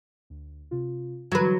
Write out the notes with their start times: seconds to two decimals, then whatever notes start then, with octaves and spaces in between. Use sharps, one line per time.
0.30 D2
0.71 C3 F4
1.32 D3 E3 F#3 G3 B4